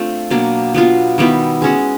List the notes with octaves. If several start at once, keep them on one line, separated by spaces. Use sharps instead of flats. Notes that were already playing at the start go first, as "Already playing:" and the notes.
Already playing: A3 C4 D4 F4
B2 F#3 A#3 D4
F#3 B3 D4 F4
D#3 G3 B3 E4
G#3 C#4 F#4